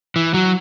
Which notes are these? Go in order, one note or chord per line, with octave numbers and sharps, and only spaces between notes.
E3
F#3